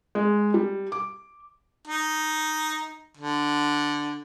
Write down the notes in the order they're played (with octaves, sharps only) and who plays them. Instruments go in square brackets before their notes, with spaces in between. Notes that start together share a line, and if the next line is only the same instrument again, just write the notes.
[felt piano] G#3
G3
D6
[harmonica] D#4
D3